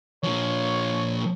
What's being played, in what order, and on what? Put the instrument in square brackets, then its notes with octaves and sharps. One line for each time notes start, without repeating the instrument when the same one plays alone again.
[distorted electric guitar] A#2 F3 [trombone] C#5